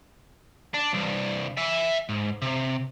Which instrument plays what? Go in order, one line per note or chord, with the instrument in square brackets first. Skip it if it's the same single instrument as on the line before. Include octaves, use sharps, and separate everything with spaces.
[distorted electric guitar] D4
C2 G2
E5 G#5
G#2
C3